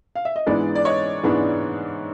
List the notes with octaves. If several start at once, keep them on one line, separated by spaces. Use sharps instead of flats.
F5
E5
D#5
G#2 E3 G#3 B3 D4 D5
D5
C#5 D#5
G#2 E3 G#3 B3 D4